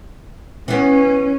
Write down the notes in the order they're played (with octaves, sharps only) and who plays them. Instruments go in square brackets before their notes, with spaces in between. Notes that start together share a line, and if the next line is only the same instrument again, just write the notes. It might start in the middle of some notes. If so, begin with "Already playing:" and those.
[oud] E3 B3 [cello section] C#4